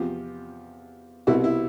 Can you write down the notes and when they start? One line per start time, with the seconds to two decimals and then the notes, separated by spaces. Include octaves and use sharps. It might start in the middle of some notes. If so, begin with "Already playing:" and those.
Already playing: E2 C3 F3 F4 G4
1.27 C2 B2 G3 E4 F#4
1.44 E4